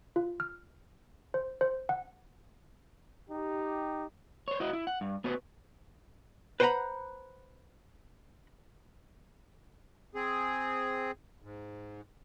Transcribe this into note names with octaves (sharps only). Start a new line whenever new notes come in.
F4
F6
C5
C5
F#5
D#4 G4
C5 C#5
E4 F#4 D#5
E4
F#5
G2
B3 F#4 B4 C5
B4 C5 F#5 G5 A#5 B5
C4 G#4
G#2